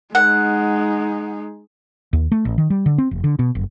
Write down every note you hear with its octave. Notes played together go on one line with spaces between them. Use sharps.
G#3 D#4 F#5
D#2
A3
A1
D#3
G3
D3
C4
F1
D3
B2
F#1